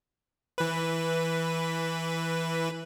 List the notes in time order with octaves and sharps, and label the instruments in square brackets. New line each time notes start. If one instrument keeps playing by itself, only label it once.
[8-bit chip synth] E3 B4